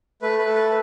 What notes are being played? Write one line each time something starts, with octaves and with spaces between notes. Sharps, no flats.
A3 B4
B4
A4
B4